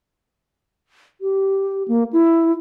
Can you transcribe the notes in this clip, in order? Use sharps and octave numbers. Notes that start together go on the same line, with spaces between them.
G4
A#3
E4